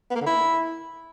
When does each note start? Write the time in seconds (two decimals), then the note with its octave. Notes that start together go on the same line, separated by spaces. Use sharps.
0.11 B3
0.16 A#3
0.21 D3
0.26 E4